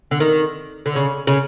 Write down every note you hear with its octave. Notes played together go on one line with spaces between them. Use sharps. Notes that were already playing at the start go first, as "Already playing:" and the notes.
D3
D#3
D3
C#3
C#3